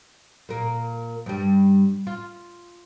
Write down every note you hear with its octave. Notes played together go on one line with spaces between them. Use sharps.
A#2 A#3
G2 G3
F4